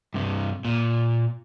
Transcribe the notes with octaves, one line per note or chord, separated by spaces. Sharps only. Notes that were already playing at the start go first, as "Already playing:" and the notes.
G2 C3
A#2